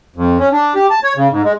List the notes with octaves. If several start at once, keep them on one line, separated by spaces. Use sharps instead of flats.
F2
C#4
D4
G4
A5
C#5
C#3
G#2
G#3